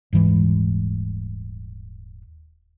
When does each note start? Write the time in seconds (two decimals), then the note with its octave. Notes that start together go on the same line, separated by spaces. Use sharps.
0.13 D#1 G#2 E3 G#3